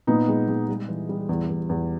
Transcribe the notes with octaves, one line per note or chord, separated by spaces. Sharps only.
A#2 B3 D#4
G#3
G#3
G3
E3
G3
E2
E2
E2